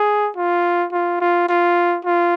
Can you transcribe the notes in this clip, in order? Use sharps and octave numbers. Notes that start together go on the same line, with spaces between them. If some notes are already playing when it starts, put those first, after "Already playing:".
Already playing: G#4
F4
F4
F4
F4
F4